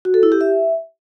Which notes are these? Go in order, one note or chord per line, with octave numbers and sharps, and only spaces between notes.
F#4
A4
E4
G4
E5